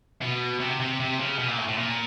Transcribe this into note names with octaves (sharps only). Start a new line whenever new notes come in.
B2
C3
C3
C3
C#3
B2
A#2
A2
A2
A#2